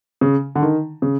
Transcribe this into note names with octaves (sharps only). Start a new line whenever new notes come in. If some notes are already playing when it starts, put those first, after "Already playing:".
C#3
D3
D#3
C#3